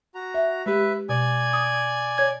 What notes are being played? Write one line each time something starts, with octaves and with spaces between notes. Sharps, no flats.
F#4 A#5
E5
G#3 G4 B4 E5
B2 D5 G#5
D#6
C#5 G#6